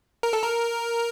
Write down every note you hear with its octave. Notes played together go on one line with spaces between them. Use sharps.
A#4
A4
A#4